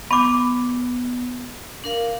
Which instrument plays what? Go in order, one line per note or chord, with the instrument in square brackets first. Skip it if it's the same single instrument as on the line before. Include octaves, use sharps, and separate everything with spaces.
[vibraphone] B3 [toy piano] B5 D6
[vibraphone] D4 A#4 F5